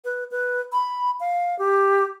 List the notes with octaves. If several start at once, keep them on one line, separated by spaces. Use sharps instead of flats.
B4
B4
B5
F5
G4